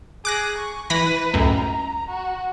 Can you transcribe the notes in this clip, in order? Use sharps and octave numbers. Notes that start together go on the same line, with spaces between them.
G#4 D6 F#6 A#6
C#6
E3 B4 B5 A#6
C#2 F#2 A2 A#5
F#4